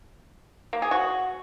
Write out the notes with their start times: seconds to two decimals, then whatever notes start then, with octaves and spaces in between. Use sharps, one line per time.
0.73 A#3
0.82 G#4
0.91 F#4